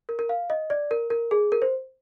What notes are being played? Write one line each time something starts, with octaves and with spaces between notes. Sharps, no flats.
A#4
A#4
F5
D#5
D5
A#4
A#4
G#4
A#4
C5